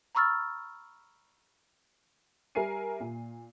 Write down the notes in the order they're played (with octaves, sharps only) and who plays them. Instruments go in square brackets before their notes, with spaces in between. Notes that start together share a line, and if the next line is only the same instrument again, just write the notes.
[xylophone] A#5 B5 C#6 E6 F6 A6
[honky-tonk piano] G3 A#4 E5 G#5 C7 D#7
A#2